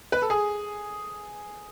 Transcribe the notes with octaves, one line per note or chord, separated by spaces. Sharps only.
B4
A4
G#4